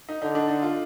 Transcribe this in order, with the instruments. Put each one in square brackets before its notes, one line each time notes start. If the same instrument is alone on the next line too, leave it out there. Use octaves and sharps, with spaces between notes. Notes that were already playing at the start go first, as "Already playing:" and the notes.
[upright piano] D#4
[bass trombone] D3 [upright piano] D#4
[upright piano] D4
D#4
F4